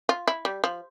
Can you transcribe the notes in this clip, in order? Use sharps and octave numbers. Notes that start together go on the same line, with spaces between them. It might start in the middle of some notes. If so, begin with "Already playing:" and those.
F4
E4
G3
F3